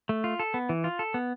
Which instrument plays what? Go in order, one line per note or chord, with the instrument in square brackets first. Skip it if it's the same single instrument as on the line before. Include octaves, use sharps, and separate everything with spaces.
[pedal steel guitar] A3
F4
A4
B3
E3
F4
A4
B3